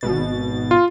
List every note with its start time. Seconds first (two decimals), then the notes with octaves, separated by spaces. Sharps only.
0.01 G#1 B2 A6
0.71 F4